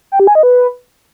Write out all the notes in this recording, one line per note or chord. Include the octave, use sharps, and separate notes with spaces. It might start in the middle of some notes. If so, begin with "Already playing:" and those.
G5
G4
G#5
D#5
B4